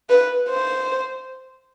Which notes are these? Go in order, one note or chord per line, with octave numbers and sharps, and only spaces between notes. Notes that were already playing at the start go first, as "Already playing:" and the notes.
B4
C5